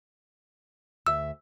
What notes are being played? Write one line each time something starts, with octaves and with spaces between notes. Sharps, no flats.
D2 E5 E6